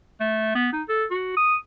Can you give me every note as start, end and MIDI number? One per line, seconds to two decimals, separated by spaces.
0.20 0.53 57
0.55 0.71 59
0.73 0.82 63
0.89 1.05 69
1.11 1.35 66
1.37 1.56 87